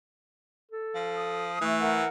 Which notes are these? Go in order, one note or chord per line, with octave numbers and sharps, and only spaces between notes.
A4
F3
D#6
E3 A3
A#4 F#5